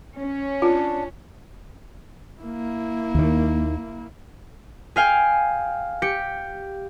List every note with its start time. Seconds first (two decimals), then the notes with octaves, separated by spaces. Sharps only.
0.16 C#4
0.62 D4 F4
2.41 A#3 E4
3.15 D#2 D#3
4.96 G#4 F5 G5 G#5
6.02 G4 C#7